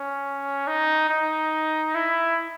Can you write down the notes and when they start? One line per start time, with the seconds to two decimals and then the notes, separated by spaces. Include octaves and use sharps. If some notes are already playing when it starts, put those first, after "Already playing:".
Already playing: C#4
0.68 D#4
1.10 D#4
1.95 E4